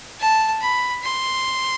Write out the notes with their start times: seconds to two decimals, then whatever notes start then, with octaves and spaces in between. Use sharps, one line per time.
0.20 A5
0.61 B5
1.03 C6